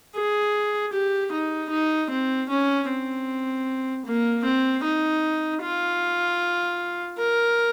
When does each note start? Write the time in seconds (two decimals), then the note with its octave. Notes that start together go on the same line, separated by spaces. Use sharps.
0.15 G#4
0.93 G4
1.32 D#4
1.70 D#4
2.10 C4
2.49 C#4
2.88 C4
4.05 A#3
4.44 C4
4.83 D#4
5.62 F4
7.18 A#4